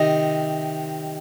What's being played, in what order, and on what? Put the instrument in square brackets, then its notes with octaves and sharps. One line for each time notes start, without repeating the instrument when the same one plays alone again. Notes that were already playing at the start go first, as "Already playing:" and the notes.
Already playing: [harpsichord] C3 D#3 D#5